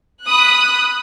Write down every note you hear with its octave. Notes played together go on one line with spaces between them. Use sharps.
B5 D#6 F#6